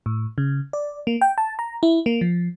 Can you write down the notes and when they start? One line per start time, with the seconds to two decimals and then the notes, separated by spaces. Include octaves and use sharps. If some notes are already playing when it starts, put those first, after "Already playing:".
0.06 A2
0.38 C#3
0.73 D5
1.07 A#3
1.21 G5
1.38 A5
1.59 A#5
1.83 E4
2.06 A#3
2.21 F3